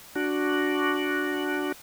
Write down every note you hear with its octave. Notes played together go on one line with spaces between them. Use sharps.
D4 F#4